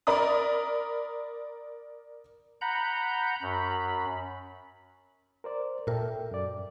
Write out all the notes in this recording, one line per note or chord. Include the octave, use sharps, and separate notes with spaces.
A#4 D5 A#5 B5 D#6
F#5 A#5 B5 G6
F#2 B5
A#4 C5 D5
A#2 A4 A#4 E5 G5
F#2 D5